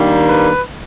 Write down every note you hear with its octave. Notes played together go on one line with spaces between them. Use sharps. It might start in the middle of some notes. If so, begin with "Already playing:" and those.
Already playing: D#3 G3 A#3 D4
B4